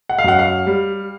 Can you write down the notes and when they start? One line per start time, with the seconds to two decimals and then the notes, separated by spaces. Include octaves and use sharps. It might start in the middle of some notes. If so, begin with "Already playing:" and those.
0.09 F#5
0.19 F5
0.24 F#2 F#5
0.39 F5
0.67 G3